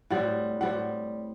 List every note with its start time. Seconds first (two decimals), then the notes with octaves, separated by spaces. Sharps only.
0.10 A2 G3 C4 F#5
0.61 A2 G3 C4 F#5